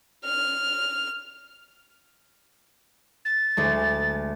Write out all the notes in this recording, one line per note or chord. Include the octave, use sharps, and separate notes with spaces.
F6
A6
D2 G#3 A3